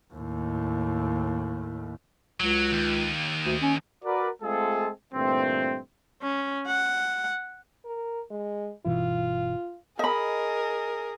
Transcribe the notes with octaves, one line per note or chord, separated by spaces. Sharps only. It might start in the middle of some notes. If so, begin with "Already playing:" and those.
D#2 A2
C#2 F#3
D#2
D2
C#4
F#4 A#4 B4 D5
G#3 A3 C4 F4 G#4 A4
G2 A#2 E3 A3 C4
C#4
F#5
A#4
G#3
G1 B2 E3 F4
G#4 A#4 D#5 B5